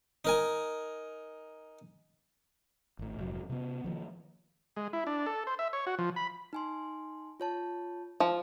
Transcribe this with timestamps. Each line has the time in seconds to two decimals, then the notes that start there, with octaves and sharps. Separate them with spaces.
0.25 D#4 A#4 G#5
2.99 G#1 A2
3.19 F1 G#2 F#3
3.50 C3 B3
3.84 D#3 F3 A#3
4.77 G#3
4.93 E4
5.07 D4
5.26 A4
5.47 C5
5.59 E5
5.73 C#5
5.87 F#4
5.99 F3
6.16 B5
6.53 D#4 G#5 C6
7.40 F4 C#5 A5
8.20 F3